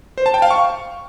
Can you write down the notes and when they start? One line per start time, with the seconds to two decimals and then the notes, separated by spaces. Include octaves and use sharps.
0.18 C5
0.26 A5
0.34 G5
0.42 F5
0.50 C#6